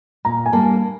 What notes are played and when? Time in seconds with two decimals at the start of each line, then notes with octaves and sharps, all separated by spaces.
0.25 A#2 A#5
0.46 G#5
0.53 G3 A#3 D4 A5